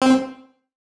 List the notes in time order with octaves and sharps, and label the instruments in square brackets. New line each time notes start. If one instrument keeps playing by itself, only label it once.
[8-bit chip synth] C4